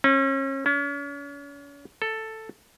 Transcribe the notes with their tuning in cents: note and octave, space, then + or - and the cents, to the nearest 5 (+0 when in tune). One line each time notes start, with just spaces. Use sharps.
C#4 -35
C#4 +40
A4 +5